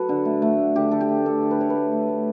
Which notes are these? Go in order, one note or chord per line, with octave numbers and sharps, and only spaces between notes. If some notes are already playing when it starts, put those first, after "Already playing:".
Already playing: F#3 F#4 A4 B4
D3
A3
A3
D3
D3 G4
D3 A4
G4
A3
D3 A4
D3
B4
D3 C#5
B4
A3
A3
A3